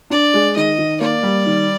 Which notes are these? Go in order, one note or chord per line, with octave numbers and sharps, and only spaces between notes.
D4 D5
G#3
D#3 D#5
D#3
A#3 D5
G3
D#3